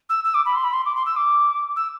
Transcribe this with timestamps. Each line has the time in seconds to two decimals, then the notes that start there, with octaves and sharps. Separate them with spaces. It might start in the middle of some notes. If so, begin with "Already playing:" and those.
0.09 E6
0.24 E6
0.34 D6
0.45 B5
0.55 C6
0.64 B5
0.73 C6
0.85 D6
0.96 C6
1.06 E6
1.16 D6
1.76 E6